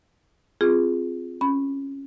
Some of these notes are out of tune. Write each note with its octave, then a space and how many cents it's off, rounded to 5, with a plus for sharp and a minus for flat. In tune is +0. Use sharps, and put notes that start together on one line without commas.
C4 +0 F4 +0 G#4 +0
C#4 -10 B5 +0